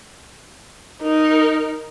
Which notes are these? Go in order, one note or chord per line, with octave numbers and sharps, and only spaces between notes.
D#4 A#4